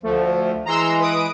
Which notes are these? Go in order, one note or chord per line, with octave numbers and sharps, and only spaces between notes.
D2 F3 A3
E3 G#3 A#5 C6 E6
B4 D#6 D7